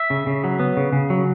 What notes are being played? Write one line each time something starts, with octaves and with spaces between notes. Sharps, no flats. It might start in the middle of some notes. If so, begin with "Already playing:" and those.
Already playing: E5
C#3
C#3
F#3
B3
C#3
C#3
F#3